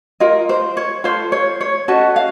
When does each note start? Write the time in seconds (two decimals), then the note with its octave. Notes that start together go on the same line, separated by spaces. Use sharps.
0.20 F4 A#4 D#5
0.49 C5
0.77 C#5
1.04 F4 A4 C5
1.32 C#5
1.61 C#5
1.88 C#4 F#4 A4 D#5
2.16 F5